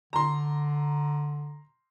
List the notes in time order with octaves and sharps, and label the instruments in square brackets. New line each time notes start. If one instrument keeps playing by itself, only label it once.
[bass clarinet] D3 [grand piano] A#5 C6